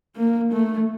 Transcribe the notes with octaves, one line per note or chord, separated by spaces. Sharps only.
A#3
A3